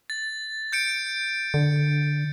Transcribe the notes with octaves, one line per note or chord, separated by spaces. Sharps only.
A6
G6 C#7 D7
D3